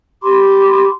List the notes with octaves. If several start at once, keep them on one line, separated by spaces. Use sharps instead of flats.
G4 B5 C6 D6